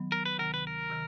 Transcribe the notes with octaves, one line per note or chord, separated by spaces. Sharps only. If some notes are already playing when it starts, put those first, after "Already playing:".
Already playing: D#3 F#3 B3
A#4
B4
D2 C3 D#3 A#4
B4
A#4
C3 D#3